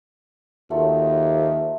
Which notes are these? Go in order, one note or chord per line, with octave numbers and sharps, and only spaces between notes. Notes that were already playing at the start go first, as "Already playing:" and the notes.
D#2 F#3 A3 F4